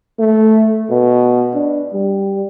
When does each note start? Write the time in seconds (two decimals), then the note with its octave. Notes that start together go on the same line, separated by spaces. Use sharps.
0.19 A3
0.90 B2
1.54 D4
1.93 G3